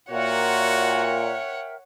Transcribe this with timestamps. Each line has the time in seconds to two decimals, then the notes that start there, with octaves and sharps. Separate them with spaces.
0.10 A#2 F#4 A#4 C#5 E5 F#5 G5